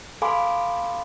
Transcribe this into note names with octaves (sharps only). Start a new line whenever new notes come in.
A4 F5 G#5 B5 C6 D6